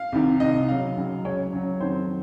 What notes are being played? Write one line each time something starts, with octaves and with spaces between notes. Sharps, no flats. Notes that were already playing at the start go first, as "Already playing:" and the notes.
Already playing: F5
C2 C3 D#3
C2 C3 D#3 D#5
F#2 C#3 F#3 F5
F#2 C#3 F#3
C#2 C#3 F#3 C#5
C#2 C#3 F#3
F2 D#3 F#3 C5